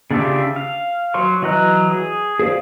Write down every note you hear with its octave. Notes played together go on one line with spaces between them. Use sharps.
C#3 D4 F4 G4 E5
F5
F#3 C#5 C6 C#6
E3 F#3 D#5 A#5 F#6
G#4
G#4 C5 D5 F5